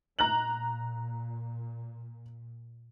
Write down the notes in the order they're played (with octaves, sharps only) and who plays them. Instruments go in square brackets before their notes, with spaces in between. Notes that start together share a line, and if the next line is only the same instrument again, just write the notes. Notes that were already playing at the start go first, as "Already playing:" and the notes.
[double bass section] A#2 [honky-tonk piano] A#5 F#6 F#7